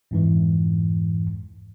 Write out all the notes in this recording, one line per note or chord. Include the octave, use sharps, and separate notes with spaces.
F2 G#2 E3